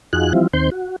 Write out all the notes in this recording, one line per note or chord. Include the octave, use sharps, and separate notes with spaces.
F2 D#4 F4 F#4 G#4 F#6
E3 F3 G3 C4 E4 F4
D#2 D#3 C4 C5 C6 G6
F#4